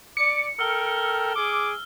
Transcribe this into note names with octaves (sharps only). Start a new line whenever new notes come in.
D5 D6 C#7
A4 A#4 G5 E6 F6 G7
G#4 D6